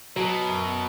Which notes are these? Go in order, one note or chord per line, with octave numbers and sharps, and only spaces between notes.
B2 F#3
F#2